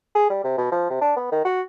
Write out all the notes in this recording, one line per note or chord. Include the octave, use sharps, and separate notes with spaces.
G#4
G3
C3
B2
F3
C3
D4
B3
D#3
F#4